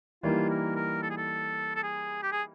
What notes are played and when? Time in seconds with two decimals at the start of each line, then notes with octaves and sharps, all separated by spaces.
0.23 E3 G3 A#3 D#4 F4
0.50 A#4
0.76 A#4
1.03 A4
1.10 G#4
1.17 A4
1.76 A4
1.83 G#4
2.23 G4
2.32 G#4